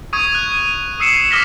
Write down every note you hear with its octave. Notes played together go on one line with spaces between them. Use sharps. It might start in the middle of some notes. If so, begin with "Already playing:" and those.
C#6 D#6 G#6 D#7
F#6 G#6
D#6 E6 C7 C#7 E7
D6 D#6 F6 A#6 B6